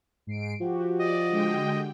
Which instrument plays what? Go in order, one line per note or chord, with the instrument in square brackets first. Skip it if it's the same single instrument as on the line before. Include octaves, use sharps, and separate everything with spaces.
[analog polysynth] G#2 C7 D7
[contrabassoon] F3 [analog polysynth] F#4 G4
[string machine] D5 [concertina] D#5
[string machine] D3 G#3 G5